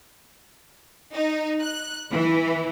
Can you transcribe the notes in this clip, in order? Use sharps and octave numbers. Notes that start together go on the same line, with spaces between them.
D#4
F#6
E3